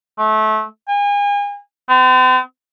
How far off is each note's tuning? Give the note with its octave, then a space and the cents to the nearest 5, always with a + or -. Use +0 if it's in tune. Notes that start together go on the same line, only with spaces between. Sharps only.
A3 -25
G#5 -35
C4 -45